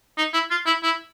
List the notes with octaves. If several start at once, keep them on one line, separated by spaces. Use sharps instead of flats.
D#4
E4
F4
E4
E4